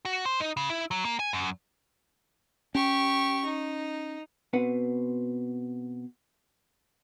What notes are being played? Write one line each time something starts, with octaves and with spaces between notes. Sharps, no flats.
F#4
C5
D#4
C#3
E4
F#3
A#3
G#5
F#2
C#4 G4 C#6
D#4
B2 C4 B4 F#5